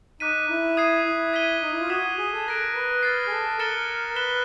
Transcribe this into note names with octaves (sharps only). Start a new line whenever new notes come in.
D#4 D6 F#6 B6 D#7
E4
D#6 G#6 C7 D#7
E4
G#6 B6 D#7 G7
D#4
E4
F4
F#4 D#6 G#6 B6 E7
G#4
A4
A#4 F#6 A#6 D7
B4
F6 A6 C7
G#4
A4
A#4 F#6 A6 C#7 E7 G7
B4 F#6 B6 E7 G7